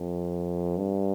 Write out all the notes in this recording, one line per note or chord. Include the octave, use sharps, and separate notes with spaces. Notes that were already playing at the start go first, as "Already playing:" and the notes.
Already playing: F2
G2